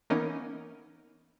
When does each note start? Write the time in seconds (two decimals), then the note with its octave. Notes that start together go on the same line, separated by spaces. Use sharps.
0.10 E3 A#3 B3 C#4 D#4 A#4